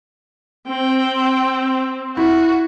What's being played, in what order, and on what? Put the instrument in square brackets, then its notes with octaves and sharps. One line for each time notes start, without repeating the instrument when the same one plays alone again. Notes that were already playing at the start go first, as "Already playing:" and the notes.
[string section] C4 [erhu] G5
[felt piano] E4 [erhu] F#4